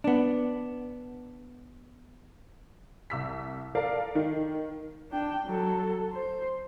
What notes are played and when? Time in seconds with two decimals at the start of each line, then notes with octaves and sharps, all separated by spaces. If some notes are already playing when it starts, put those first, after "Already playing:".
0.04 B3 D4
3.10 C2 E6 B6
3.75 A4 A#4 D5 F5
4.15 D#3
5.11 D4 G5
5.46 F#3 A4
6.13 C5